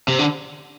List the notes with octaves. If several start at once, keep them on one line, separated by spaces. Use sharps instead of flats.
C3
D3